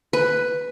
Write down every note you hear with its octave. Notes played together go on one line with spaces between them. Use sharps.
B4